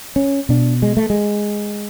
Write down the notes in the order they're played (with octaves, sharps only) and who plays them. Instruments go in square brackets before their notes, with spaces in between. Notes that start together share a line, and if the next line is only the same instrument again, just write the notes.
[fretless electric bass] C#4
B2 D4
G#3
A3
G#3